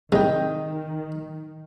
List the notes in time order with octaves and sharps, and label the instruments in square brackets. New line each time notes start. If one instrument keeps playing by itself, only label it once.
[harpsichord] C2 G#2 [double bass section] D#3 [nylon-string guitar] D#5 G5